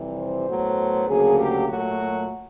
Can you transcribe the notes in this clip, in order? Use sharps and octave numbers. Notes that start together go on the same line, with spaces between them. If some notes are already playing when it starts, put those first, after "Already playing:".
Already playing: F2 C3 E3 G3
C5
A2 F#3 B3
D2 C#3 F#3 A#3 G#4
G4
A#2 F#3 A3 F#4